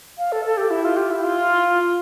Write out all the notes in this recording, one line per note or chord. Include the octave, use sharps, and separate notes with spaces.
F5
A4
A4
G4
E4
F4
G4
E4
F4